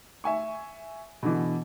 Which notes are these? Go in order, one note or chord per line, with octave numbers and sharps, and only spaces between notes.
E5 G#5 C#6
B2 D3 E3